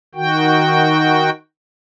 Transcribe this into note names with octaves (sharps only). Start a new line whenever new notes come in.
D#3 F#4 G5